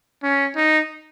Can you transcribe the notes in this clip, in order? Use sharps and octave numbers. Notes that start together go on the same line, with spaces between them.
C#4
D#4